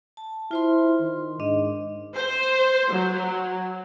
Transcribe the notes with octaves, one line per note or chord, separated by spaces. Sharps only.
A5
E4 F4 C5 C6
D#3
G#2 D4 D#5
C5
F#3